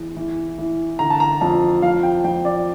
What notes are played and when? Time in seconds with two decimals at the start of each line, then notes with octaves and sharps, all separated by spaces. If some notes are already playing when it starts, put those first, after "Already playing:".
Already playing: E2
0.16 E3
0.58 E3
0.99 D3 A#5
1.10 A5
1.20 A#5
1.41 F2 A5
1.82 F2 F5
2.03 G5
2.24 F2 G5
2.45 D5